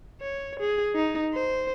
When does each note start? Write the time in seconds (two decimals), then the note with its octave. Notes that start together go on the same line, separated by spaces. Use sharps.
0.21 C#5
0.60 G#4
0.96 D#4
1.34 C5